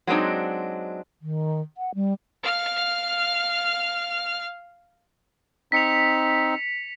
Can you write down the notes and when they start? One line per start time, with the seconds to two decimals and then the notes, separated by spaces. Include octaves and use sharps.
0.07 F#3 G#3 C4 D4 D#4
1.22 D#3
1.77 F#5
1.95 G3
2.43 F5 F6
5.72 C4 D#4 B6 C#7 F7